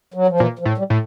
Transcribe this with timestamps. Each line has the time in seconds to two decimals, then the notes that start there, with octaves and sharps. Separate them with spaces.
0.14 F#3
0.28 F3
0.40 A#2 E3
0.59 F3
0.65 A2
0.78 G3
0.90 A2